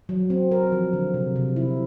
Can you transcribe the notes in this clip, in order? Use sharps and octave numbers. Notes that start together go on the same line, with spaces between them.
F#3
C4
A#4
F3
D3
C3
C3
E4